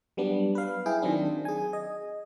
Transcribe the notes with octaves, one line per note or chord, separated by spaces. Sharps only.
F#3 G3 B3 D4
B4 F5
E4 G#4 G5
D#3 F#3 C4 D4
G#4 G#5
D#5